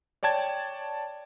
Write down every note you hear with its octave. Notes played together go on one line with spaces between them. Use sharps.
C#5 D5 G5 A5 G#6